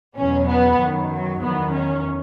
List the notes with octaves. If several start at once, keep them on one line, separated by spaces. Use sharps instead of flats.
E2 B2 F#3 C#4
B3
F#2 D#3 F#3
F#3
E2 D#3 F#3 B3
C#4